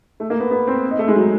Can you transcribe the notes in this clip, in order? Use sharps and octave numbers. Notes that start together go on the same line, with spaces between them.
A3
A#3
B3
B3
C4
D#4
A3
G#3
F#3